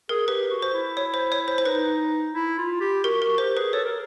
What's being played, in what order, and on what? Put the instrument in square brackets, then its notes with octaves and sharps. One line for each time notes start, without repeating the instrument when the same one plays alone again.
[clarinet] G#4 [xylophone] A#4
[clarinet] G4 [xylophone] B4
[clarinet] F#4
[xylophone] C5
[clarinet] E4
[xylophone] C#5
C5
C#5
C5
[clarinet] E4 [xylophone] C5
[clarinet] D#4 [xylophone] B4
[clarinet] E4
F4
G4
[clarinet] F#4 [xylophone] A#4
[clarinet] F#4 [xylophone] A#4
[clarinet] G4 [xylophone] C5
[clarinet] G#4 [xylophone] B4
[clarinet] A4 [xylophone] C#5
[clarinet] A#4